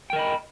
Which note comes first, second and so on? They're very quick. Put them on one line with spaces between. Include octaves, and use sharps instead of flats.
G5 A#4 D#5 B5